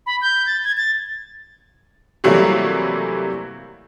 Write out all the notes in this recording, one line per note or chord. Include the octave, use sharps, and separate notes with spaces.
B5
G6
A6
G#6
A6
C3 E3 F#3 G3 A3 A#3